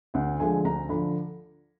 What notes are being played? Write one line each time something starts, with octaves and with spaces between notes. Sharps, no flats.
D2 F#5
D3 F3 G#3 G#5
D2 A#5
D3 F3 B5